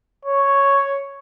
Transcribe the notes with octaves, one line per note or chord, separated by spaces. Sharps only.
C#5